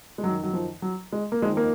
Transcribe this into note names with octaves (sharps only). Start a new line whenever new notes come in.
G#3
F#2 D#3 F#3
F#3
F3
F#3
G#3
A#3
F2 D#3 G#3
A#3